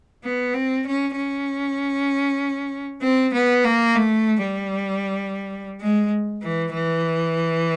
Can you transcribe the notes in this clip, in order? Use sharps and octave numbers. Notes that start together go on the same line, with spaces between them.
B3
C4
C#4
C#4
C4
B3
A#3
A3
G3
G#3
E3
E3